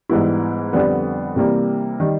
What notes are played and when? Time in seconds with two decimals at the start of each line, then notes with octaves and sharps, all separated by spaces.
0.09 G#2 E3 G3 B3 E4
0.73 F2 D3 G3 B3 D4
1.36 C3 E3 G3 A#3
2.00 D#3 G3